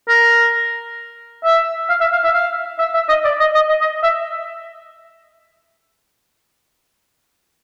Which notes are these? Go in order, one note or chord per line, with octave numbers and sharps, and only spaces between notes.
A#4
E5
F5
E5
F5
E5
F5
E5
E5
D#5
D5
D#5
D#5
D#5
D#5
E5